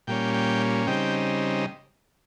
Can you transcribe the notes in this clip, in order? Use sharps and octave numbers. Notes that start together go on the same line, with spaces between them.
A#2 G3 A#3 C#4 G5
G5
C#3 G3 C4 D#4 G5